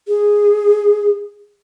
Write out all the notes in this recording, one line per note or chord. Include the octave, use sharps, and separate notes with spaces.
G#4